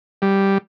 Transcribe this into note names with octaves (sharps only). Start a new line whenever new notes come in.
G3